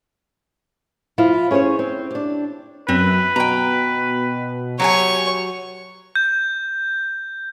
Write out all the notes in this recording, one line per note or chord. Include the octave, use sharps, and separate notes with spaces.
F3 E4 F4
C#4 G#4 A#4 C5 C#5
C4
D4 G4
F#2 C4 B4
B2 G5 A#5
F#3 G4 C#5 G#5 C#6
G6